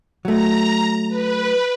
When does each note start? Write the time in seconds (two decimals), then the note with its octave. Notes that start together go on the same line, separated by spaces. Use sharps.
0.25 F#3 A3 A#5
1.08 B4